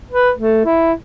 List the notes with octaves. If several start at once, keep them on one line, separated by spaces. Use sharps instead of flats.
B4
A3
E4